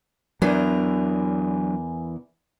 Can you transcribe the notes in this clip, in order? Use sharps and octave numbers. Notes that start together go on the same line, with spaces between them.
E2 E3 F#3 D4 A#4